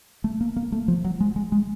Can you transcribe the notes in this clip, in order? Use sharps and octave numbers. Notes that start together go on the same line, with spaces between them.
A3
A#3
A#3
A3
F3
F#3
G#3
G#3
G#3